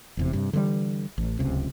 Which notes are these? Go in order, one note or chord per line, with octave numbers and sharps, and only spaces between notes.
F1 E2 C3
G2 C3
D3 E3 F#3 G3
A1
D1 C#2 C3